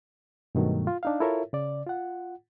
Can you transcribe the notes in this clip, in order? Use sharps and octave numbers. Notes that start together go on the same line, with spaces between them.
G2 B2 D#3 F#3 A3
F4
D4 D#4 F5
E4 F4 A4 A#4 C#5 E5
C#3 D5
F4 F#5